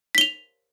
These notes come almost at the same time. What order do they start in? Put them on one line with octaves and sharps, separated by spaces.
B6 G7 F7